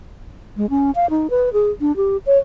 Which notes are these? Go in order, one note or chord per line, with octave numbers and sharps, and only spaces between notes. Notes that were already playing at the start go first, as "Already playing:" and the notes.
G#3
C#4
F5
D#4
B4
G#4
D4
G4
C#5